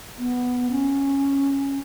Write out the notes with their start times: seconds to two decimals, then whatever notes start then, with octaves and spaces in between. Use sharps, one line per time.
0.18 B3
0.71 C#4